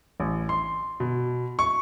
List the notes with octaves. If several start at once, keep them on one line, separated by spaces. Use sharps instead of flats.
A1
C6
B2
C#6